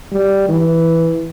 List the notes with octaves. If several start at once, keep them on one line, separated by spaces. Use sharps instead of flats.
G3
E3